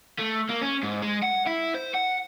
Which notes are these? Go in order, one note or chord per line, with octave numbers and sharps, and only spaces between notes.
A3
A#3
C#4
G#2
G#3
F#5
E4
C5
F#5